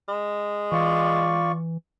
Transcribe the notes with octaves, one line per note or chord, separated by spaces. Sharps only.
G#3
E3 F4 D5 C#6